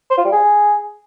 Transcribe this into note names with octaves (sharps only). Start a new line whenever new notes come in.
C5
F4
G3
G#4